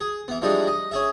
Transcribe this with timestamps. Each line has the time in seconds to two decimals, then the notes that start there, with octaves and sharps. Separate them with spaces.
0.01 G#4
0.28 E3 B3
0.42 E3 F3 G3 G#3 D4 D#4
0.67 D#5
0.91 C#4 G#4 E5